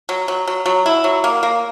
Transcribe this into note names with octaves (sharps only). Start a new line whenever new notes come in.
F#3
F#3
F#3
F#3
E4
F#3
A#3
A#3